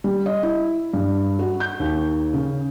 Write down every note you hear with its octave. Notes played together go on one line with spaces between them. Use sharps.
G3
D#5
E4
G2
F#4
G6
D#2
C#3